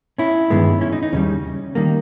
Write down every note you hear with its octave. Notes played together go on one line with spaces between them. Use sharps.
C#4 E4
G2 D#3 G#3 B3
C#4 E4
D#4
D#4
D#2 C#3 G3 C#4
D#3 G3 A#3